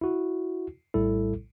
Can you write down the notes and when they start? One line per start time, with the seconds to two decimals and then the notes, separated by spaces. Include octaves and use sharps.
0.01 E4 F#4
0.94 A#1 A2 G3 E4 A4